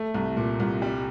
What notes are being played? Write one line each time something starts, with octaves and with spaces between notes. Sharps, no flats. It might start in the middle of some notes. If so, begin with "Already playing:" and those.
Already playing: A3
C2
A#2
C2
G3